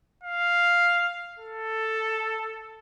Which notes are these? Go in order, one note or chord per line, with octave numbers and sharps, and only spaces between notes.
F5
A4